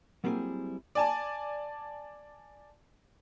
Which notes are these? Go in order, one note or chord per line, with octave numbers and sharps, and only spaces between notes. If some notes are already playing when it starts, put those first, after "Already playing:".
F#3 G3 A#3 C4 E4 G#4
D5 G#5 A5